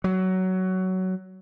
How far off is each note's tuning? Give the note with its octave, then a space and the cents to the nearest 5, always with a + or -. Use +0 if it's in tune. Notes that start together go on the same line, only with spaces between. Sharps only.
F#3 +15